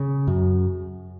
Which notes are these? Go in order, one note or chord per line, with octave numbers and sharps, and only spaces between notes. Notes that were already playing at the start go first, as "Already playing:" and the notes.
Already playing: C#3
F#2